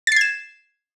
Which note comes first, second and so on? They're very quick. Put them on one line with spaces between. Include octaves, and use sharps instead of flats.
A6 C7 G#6 E7